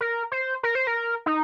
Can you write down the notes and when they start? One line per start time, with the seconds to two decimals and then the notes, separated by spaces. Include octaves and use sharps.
0.01 A#4
0.32 C5
0.63 A#4
0.75 C5
0.87 A#4
1.26 D#4